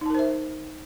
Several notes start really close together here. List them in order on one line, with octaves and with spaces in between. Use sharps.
D#4 A5 A#4 C5 E5